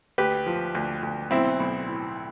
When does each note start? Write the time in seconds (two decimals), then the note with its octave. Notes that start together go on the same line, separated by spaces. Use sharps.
0.18 D2 G4 B4
0.46 F3
0.75 D2
1.03 D2
1.31 B1 C4 E4
1.60 B1
1.88 A2